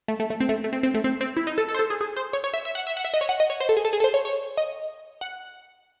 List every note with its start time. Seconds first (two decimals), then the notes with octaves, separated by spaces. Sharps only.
0.08 A3
0.20 A3
0.30 A3
0.40 C4
0.49 A3
0.64 A3
0.73 C4
0.83 C4
0.94 A3
1.04 C4
1.21 C4
1.37 E4
1.47 D#4
1.58 A4
1.69 A4
1.75 C5
1.79 A4
1.90 G#4
2.01 G#4
2.17 C5
2.33 C#5
2.44 C#5
2.54 E5
2.65 E5
2.75 F#5
2.87 E5
2.97 F#5
3.05 E5
3.14 D#5
3.21 C#5
3.29 F#5
3.40 D#5
3.50 C#5
3.60 C5
3.69 A4
3.77 G#4
3.85 A4
3.93 G#4
4.00 A4
4.04 C5
4.14 C#5
4.25 C#5
4.57 D#5
5.21 F#5